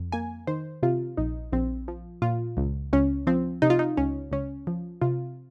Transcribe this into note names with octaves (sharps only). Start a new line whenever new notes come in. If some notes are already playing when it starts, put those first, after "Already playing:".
Already playing: F2
A#3 G#5
D#3 C5
C3 F4
A#1 D#4
A#1 C4
F3
A#2 F4
C#2
C#2 C#4
F3 C4
C3 D#4
F4
D#4
C#2 C#4
C#2 C#4
F3
C3 F4